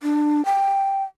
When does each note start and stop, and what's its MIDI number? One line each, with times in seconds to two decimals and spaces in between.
0.03 0.44 62
0.45 1.03 79